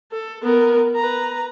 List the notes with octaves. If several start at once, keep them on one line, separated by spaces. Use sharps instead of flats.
A4
B3 A#4
B4 A#5